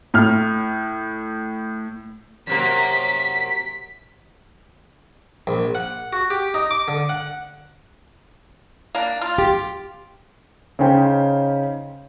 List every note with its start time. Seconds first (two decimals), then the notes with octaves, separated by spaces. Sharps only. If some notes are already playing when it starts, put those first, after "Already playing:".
0.14 A2 F6
2.47 F#2 C3 A#3 B6
5.47 A#1
5.75 F#5
6.13 F#4
6.30 G4
6.54 D#4
6.71 D6
6.88 D3
7.09 F#5
8.95 A#3 D4
9.21 F4
9.38 G4
10.79 C#3 C#4 D#4 C5 G5